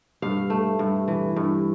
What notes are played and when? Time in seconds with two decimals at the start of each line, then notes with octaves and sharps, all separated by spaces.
0.22 G2 F5
0.50 A3
0.79 G2
1.08 E3
1.36 G2